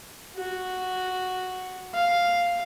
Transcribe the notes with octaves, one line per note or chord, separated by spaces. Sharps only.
F#4
F5